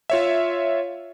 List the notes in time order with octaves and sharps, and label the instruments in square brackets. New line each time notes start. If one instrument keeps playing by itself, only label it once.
[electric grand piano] F4 C#5 E5